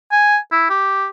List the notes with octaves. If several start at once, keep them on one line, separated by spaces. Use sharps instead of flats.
G#5
E4
G4